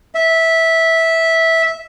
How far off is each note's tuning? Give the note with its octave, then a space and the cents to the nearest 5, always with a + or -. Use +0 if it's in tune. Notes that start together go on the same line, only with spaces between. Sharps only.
E5 -10